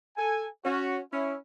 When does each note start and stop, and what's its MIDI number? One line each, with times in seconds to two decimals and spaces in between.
0.17 0.46 69
0.17 0.46 80
0.64 0.99 61
0.64 0.99 66
1.12 1.35 61
1.12 1.35 64